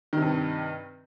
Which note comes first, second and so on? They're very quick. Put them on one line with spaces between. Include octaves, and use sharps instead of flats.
D#3 C3 G2